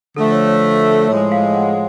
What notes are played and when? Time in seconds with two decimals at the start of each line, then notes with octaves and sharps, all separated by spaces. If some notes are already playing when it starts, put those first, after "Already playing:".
0.16 D3 F3 A3 A4
0.32 C#5
0.47 C#5
1.08 A2 F3 G#3 C#5
1.32 F5
1.54 F#5